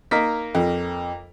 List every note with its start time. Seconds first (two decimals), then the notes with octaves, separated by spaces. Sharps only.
0.11 A#3 D#4 A#4 B6
0.55 F2